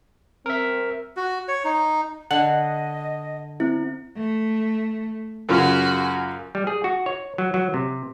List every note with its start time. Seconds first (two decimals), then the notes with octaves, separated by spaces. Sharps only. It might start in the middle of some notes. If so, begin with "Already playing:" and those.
0.46 C4 A#4 E5
1.17 F#4
1.48 C#5
1.64 D#4
2.31 D3 D#5 F#5
3.60 C4 E4
4.17 A3
5.49 F#2 C#3 F4 F#4 G#5
6.55 G3
6.67 G#4
6.84 F#4
7.06 C#5
7.38 F#3
7.54 F#3
7.74 C3